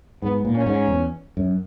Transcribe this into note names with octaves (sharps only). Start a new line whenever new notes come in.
G#2 B3
A#2
C#4
G#2
E2
F#2